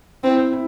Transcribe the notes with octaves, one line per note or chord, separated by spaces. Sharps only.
C4 E4
E4
E4